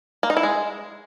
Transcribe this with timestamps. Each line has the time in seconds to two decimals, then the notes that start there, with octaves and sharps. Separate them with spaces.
0.23 A#3
0.30 D#4
0.37 E4
0.43 G#3